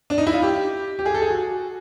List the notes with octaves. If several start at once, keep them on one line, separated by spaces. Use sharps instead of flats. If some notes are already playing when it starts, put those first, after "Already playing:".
D4
D#4
E4
F4
G4
G4
G#4
A4
G#4
F#4